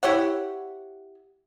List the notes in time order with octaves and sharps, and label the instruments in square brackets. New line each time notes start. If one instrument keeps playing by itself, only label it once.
[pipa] E4 G4 C#5 F#5